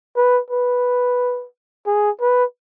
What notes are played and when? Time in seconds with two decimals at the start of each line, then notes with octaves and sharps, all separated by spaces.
0.16 B4
0.50 B4
1.86 G#4
2.20 B4